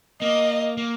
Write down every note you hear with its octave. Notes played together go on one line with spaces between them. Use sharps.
A#3 D#5
A#3